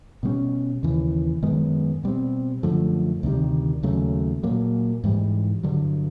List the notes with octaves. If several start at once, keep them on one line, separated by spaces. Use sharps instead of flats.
B2 G3 A#3 C#4
D#2 C#3 E3
F#2 D#3 G#3 B3
B2 G3 C4
F#2 D3 F3 A3
D2 C3 D#3 G3
D#2 C#3 F#3 A3
A#2 F#3 A#3
G#2 E3 G3
G2 D3 F#3